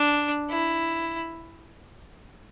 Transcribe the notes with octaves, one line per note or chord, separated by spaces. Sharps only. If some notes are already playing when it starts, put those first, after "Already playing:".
Already playing: D4
E4